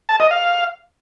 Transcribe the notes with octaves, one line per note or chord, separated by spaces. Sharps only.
A5
D#5
F5